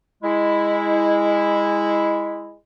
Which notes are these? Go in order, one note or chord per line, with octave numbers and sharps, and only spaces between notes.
G#3 E4